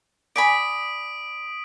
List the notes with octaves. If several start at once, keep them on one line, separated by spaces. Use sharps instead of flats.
D5 G#5 B5 D#6 B6 D7